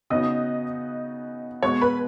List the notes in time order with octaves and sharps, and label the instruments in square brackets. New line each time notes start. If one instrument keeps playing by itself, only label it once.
[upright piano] C#3 B3 D#4 F#4 [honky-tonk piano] D#5 D#6
[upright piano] B2 G#3 B3 [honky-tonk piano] C#5 C#6
[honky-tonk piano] B4 B5